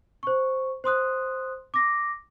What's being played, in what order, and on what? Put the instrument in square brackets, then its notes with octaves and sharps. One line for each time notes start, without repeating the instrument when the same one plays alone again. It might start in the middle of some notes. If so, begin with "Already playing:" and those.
[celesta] C5 C#6
C5 C6 D#6 F#6
D6 A#6